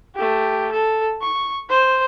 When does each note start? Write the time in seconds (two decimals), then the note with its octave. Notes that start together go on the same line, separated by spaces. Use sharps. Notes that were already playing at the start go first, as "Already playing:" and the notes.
0.15 A3 G4
0.72 A4
1.21 C#6
1.69 C5